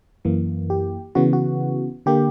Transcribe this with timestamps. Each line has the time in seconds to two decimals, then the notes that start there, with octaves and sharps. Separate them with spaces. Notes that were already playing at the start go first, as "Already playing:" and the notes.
0.25 F#2 E3 A#3
0.70 G4
1.15 C#3 E3 B3 F#4
1.33 F#4
2.06 D3 A#3 G4